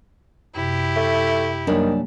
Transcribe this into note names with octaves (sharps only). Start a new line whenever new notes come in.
F#2 C3 E4 G4
A3
F#2 D#3 G3 A#3 D4